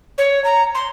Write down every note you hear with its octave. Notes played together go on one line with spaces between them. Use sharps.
C#5
A#5
C6